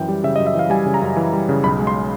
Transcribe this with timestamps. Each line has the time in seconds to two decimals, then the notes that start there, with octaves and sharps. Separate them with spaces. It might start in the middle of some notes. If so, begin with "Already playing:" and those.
Already playing: F#2 E3 G5
0.09 G3
0.24 C#3 E5
0.36 D#5
0.40 F#2
0.47 E5
0.55 E3 F5
0.70 G3 G#5
0.86 C#3
0.94 A#5
1.02 F#2
1.17 E3
1.33 G3
1.49 C#3
1.64 B1 B5
1.79 G#3
1.87 C6